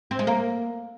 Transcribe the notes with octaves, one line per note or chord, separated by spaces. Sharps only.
C4
G#3
A#3